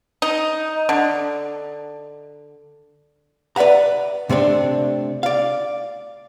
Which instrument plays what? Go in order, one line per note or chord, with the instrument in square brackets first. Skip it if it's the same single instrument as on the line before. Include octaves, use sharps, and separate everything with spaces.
[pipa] D#4
D3
[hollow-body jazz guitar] B4 D5 E5 F#5 A#5
C3 A3 C4 D4
D5 F5